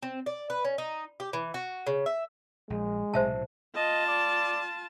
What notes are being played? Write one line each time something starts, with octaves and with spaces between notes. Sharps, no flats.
C4
D5
B4
C#4
D#4
G4
E3
F#4
C#3
E5
A#1 G#3
B1 A2 C3 C5 E5 A5
F4 D#5 A5
D5